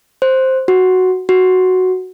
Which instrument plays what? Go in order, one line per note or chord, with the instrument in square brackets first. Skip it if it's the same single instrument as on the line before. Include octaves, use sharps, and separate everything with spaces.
[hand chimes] C5
F#4
F#4